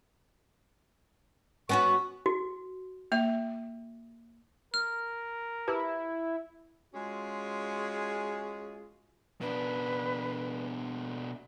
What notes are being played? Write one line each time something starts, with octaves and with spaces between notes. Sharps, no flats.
B3 C#4 F#4 C#6
F#4
A#3 E5
A#4 F6
E4 G4 B4 A5
G#3 C#4 F4 F#4 G#4
B2 D4 B4